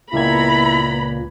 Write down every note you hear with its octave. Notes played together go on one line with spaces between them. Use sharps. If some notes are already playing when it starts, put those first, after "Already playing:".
C#2 A#2 B3 E4 A#5 B5 G#6